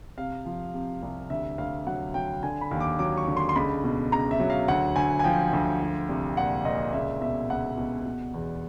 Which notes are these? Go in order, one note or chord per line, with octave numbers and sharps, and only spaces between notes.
C3 F5
F3
C3
C2
D2 E5
D2 F5
F#3 F#5
F#3 G5
D3 G#5
B5
D#2
D6
F#3 D6
C#6
D3
C6
C6
C#2 B5
B2
C#2 A#5
E5
F#3
F5
D2 F#5
D2 G#5
G#5
F3 G5
D2
F3
C2
A#2 F#5
A#2 D#5
C#2 E5
B2 E5
C#2 F#5
B2
B2
E2